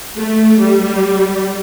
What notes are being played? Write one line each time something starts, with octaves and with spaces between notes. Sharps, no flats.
A3
G3